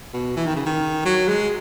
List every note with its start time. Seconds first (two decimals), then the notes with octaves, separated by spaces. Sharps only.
0.13 B2
0.36 E3
0.47 D#3
0.56 C#3
0.66 D#3
1.05 F#3
1.28 G#3